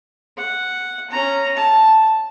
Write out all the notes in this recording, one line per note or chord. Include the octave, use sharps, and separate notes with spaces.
F#5
C#4 A#5
A5